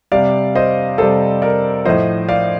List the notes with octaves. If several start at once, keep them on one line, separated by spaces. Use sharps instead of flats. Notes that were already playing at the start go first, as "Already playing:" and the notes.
C3 G3 D5 F5
C5 D#5
C3 G3 A4 C5
A#4 D5
A2 F3 C5 D#5
D5 F5